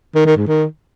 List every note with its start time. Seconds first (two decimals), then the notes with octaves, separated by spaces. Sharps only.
0.15 D#3
0.26 D#3
0.37 G#2
0.47 D#3